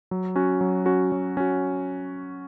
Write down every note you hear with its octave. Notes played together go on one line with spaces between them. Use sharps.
F#3
C#4 F#4
F#3
C#4 F#4
F#3
C#4 F#4